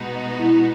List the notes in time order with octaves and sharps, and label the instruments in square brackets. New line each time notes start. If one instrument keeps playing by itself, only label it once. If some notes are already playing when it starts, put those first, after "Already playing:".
Already playing: [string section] B2 G#3 B3 D#4 F#4
[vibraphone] E4